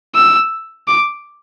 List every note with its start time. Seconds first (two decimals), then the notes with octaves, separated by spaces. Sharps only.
0.15 E6
0.88 D6